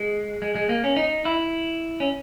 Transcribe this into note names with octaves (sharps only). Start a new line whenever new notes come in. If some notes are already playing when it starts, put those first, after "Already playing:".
Already playing: G#3
G#3
G#3
A#3
C#4
D#4
E4
C#4